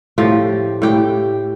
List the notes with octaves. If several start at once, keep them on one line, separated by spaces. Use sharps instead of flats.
A2 F3 G4
A2 G4 G5